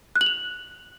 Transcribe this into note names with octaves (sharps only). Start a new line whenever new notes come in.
F#6
F#7
F7